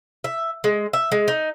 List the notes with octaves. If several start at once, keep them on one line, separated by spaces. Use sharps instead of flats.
E5
G#3
E5
G#3
D#4